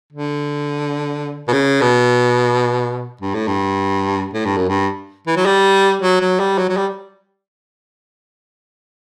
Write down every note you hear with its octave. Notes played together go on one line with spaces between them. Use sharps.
D3
B2
C#3
B2
G2
A2
G2
A2
G2
F#2
G2
E3
F#3
G3
F#3
F#3
G3
F#3
F#3
G3